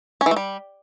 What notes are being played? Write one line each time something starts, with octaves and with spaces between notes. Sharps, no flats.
C#4
E3
A3
G3